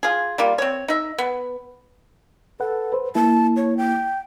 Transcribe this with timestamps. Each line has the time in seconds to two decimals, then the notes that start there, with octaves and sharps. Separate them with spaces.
0.03 F4 G#4
0.38 G3 A#3 F4
0.58 C4 C#5
0.88 D#4 E5
1.18 B3
2.60 A4 B4 F#5
2.93 B4 C5
3.15 A#3 E4 A5
3.57 C#5
3.77 G5